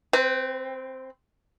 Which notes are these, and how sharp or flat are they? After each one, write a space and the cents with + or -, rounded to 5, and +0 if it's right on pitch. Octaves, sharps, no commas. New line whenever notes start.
C4 +0 B4 +45